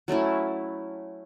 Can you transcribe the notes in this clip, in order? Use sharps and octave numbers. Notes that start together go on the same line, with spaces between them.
F#3 A3 C#4 E4